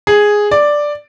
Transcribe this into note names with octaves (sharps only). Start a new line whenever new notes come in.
G#4
D5